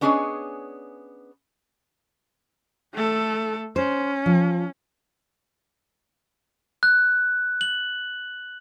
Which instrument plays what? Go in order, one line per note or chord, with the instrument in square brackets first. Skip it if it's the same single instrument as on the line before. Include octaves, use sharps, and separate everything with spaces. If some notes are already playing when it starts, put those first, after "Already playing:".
[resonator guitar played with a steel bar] B3 C#4 D4 G#4 C#5 D#5
[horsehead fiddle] A3 A4
[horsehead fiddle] C#4 [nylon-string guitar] C5
[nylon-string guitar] F3
[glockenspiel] F#6
F#7